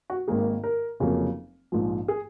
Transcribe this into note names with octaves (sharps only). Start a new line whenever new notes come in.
F#4
G#1 G#2 D#3 A#3 G#4
A#4
F1 F2 C#3 F#3 A#3
A#1 G#2 F3
G#4